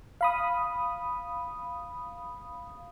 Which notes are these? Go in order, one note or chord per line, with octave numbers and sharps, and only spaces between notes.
F5 B5 D#6